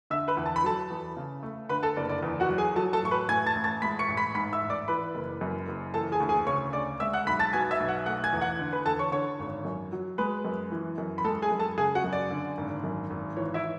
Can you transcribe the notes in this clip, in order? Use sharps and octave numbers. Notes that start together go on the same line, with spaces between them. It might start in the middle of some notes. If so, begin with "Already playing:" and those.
D3 E5 E6
B4 B5
E2
A5
B5
F#3 A4 A5
E2
C#3
A3
D3 B4 B5
A4 A5
F#1 D5
D5
E2
F#4 F#5
F#3
G#4 G#5
F#3 A4 A5
A4 A5
A1 C#6
B4 B5
A2 G#5 G#6
A5 A6
A1
A5 A6
G#3 B5 B6
C#6 C#7
A1
B5 B6
G#2 B5 B6
E5 E6
A1
D5 D6
E3 B4 B5
F#1
F#2
F#1
E3 A4 A5
G#4 G#5
D2
G#4 G#5
C#3 C#5 C#6
D2 D5 D6
G#3 E5 E6
F#5 F#6
B1 B5 B6
A5 A6
B2 G#5 G#6
E5 E6
B1
F#5 F#6
A3 F#5 F#6
G#5 G#6
E2
F#5 F#6
D3
B4 B5
E2 A4 A5
C#5 C#6
D3 C#5 C#6
G#1
F#2
F#3
G#3 B4 B5
F#2
E3
F#2
B5
G#3 A4 A5
G#4 G#5
F#2
A4 A5
C#3 G#4 G#5
F#4 F#5
F#2
D5
D3
G#1
F#2
G#1
E3 C#5
E4 E5